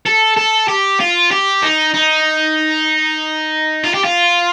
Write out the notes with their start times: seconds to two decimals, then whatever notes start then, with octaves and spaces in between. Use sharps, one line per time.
0.06 A4
0.37 A4
0.68 G4
1.00 F4
1.31 G4
1.63 D#4
1.94 D#4
3.84 F4
3.94 G4
4.04 F4